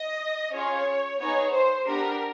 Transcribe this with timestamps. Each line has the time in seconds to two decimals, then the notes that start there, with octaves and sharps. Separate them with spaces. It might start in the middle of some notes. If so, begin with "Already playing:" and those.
Already playing: D#5
0.53 C#4 F4 G#4 C#5
1.19 B3 D#4 G#4 C#5
1.53 C5
1.86 B3 D4 G4 A#4